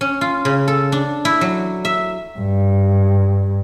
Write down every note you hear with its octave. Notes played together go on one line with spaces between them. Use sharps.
C#4
F4
C#3
A4
D4
E4
F#3
E5
G2